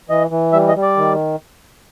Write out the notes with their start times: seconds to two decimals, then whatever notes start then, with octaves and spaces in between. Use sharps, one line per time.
0.09 E3 D#5
0.31 E3
0.53 G3 E5
0.68 D#5
0.75 G3
0.82 D5
0.97 D#3